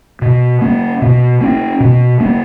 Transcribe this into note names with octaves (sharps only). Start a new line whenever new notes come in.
B2
A#3 C#4
B2
A#3 C#4
B2
A#3 C#4